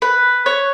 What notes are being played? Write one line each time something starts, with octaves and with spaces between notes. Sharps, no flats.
B4
C#5